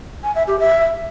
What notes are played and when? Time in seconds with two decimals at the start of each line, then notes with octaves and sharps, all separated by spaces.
0.23 G#5
0.35 E5
0.47 G4
0.59 E5